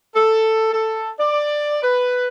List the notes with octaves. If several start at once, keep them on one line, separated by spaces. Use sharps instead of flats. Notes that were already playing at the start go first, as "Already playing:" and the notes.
A4
A4
D5
B4